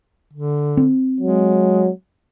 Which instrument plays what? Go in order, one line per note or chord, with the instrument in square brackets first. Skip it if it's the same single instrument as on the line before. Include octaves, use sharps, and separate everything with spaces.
[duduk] D3
[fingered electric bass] C4
[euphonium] F#3 [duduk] G#3